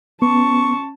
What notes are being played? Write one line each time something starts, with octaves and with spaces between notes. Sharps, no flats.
B3 C#4 A5 C#6